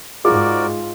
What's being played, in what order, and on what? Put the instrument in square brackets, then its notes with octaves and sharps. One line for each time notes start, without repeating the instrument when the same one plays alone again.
[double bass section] G#2 [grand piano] F4 [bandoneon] F#4 A#4 D5 [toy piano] G#4